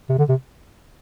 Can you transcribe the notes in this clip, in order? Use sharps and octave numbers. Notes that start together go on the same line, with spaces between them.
C3
D3
C3